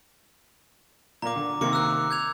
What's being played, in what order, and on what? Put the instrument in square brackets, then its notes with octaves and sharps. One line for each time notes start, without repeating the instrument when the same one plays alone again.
[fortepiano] A#2 A#3 [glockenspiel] A#5 D6
[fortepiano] D3
[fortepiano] C3 D#3 A#3 [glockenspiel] D6 C#7
[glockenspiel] E6 F#6
G6 G#6 F7